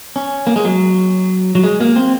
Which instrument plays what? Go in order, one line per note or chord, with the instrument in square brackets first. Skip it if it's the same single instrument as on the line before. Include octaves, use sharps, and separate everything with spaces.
[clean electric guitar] C#4
A#3
G#3
F#3
F#3
G#3
A#3
C4